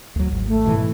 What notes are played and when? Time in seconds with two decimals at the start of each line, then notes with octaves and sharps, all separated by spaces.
0.16 D2 F#3
0.32 G#1
0.47 A3
0.65 G#2 B2 E3